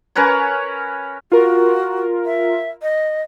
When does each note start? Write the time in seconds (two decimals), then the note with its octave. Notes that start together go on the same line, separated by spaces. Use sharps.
0.16 C#4 A#4 B4 C#5
1.32 F4 F#4 A#4
2.26 E5
2.82 D#5